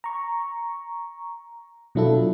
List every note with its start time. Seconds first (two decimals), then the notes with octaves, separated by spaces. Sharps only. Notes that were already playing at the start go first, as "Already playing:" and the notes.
0.04 A#5 C#6
1.95 B2 F#3 D4 E4 F4 A4